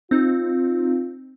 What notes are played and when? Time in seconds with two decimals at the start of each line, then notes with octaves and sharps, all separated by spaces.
0.11 C4 D#4 F4